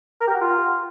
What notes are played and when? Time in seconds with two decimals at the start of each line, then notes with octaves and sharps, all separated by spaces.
0.20 A#4
0.27 G4
0.34 F#4
0.41 F4